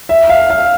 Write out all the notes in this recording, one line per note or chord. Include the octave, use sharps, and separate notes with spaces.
E5
F5
F5